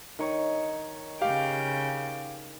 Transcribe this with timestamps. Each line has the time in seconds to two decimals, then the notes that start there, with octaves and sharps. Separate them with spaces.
0.19 D#3 C#5
1.21 C#3 G4 F5 G5